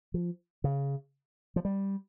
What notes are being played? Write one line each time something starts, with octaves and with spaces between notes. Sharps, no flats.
F3
C#3
F3
G3